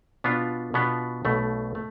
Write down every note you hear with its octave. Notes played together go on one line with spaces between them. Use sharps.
B2 B3 D4 F4
B2 B3 D4 F4
B1 B2 A3
A3